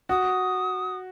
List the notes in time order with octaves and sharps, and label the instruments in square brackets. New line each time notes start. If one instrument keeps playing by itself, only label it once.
[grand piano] F#4 [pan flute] D#6